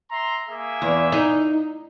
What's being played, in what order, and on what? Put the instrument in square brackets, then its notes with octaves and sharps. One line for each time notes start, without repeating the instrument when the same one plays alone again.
[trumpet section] E5 A#5 C6
A#3 G#4 E5
[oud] E2
D#4